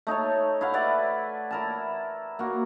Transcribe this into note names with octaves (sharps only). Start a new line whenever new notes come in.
A3 D#4 A4 C#5
E4 F5 F#5
E4 B4 D5 F#5
E4 A#4 A5
A#3 F#4